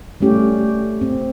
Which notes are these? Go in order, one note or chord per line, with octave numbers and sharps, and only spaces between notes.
G3 A3 C#4 G4
C4